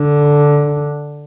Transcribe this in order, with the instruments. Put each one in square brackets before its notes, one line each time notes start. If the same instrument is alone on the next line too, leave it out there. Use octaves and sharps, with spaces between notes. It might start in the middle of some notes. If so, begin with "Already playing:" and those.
Already playing: [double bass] D3